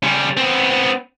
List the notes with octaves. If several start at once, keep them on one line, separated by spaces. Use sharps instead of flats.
C#3 G3
B3 C4